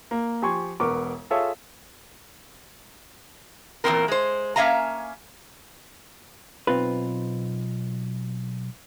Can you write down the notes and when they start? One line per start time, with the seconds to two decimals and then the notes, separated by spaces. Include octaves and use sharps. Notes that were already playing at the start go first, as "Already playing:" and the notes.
0.11 A#3
0.42 F3 G4 G#5 C6 C#6 G#6
0.80 E1 B3 A#4 C#6 D6
1.30 F4 G#4 A4 C#5 E5 F5
3.84 E2 A#2 G3 A#3 C4 A#4
4.08 G#3 C5
4.56 A#3 C#4 E5 F5 G#5 A#5
6.67 B1 E2 C4 D#4 F4 B4